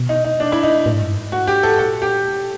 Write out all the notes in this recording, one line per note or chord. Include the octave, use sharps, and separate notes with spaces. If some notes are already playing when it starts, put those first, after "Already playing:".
Already playing: B2
D#4
D#4
D4
E4
D#4
A2
G#2
G2
G#2
F#4
G4
A4
A#2 A4
G4
B2